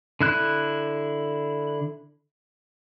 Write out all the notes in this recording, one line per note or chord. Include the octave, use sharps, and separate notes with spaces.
D3 E4 F#6